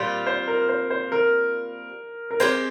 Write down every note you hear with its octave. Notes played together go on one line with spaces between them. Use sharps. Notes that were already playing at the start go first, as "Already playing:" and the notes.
Already playing: A#2 G3 C4 F4 C5
C5
A#4
C5
C5
A#4
A#4
G#3 C4 G4 C5